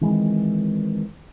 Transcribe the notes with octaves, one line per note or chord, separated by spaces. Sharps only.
D#3 E3 G#3 C4